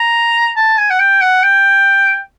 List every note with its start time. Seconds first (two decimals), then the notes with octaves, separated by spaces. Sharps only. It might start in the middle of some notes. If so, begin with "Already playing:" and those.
Already playing: A#5
0.57 A5
0.78 G#5
0.90 F#5
0.99 G5
1.21 F#5
1.43 G5